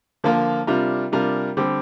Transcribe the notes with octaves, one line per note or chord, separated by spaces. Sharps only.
D3 F3 A#3 F4 A#4
C3 G3 D4 F4 A#4
C3 G3 D4 F4 A#4
D3 G3 C4 G4